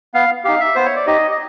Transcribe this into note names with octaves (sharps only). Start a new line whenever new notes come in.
B3 F5
D#4 G4 F5
E5
B3 C5
C#5
D5
D#4 G4 D#5
D#5